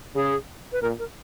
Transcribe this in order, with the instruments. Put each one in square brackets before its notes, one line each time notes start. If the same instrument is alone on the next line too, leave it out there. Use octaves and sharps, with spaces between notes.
[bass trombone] C#3 [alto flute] G#4
[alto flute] B4
[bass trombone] A#2 [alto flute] A#4
[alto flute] A#4